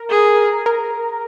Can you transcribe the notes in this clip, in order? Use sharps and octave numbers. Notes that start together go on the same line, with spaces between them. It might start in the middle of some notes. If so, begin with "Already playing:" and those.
Already playing: A#4
G#4
A#4